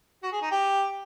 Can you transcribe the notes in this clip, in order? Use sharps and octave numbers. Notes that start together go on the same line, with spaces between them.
F#4
G#4
D#4
G4